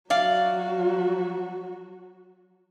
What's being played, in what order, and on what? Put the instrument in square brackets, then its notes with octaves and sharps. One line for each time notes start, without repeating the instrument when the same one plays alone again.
[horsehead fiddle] F#3 F#4 [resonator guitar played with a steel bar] D5 F5